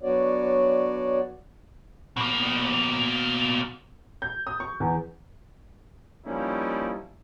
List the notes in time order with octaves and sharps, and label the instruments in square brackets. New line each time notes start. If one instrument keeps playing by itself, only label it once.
[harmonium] F#3 B3 D4 F#4 C#5 D5
[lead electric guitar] B2 A#3
[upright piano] G6
D#6
C#6
E2
[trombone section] F3 G3 A#3 C#4 D#4 E4